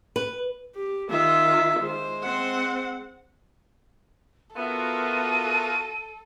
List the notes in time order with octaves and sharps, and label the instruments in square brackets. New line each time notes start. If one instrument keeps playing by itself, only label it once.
[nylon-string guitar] B4
[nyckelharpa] G4
[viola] D#3 F4 [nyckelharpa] E5
[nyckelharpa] G#3 C5
[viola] C4 F#5
[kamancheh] B3 E5 [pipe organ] F4 F#4 A#4 [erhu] A4 [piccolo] D#7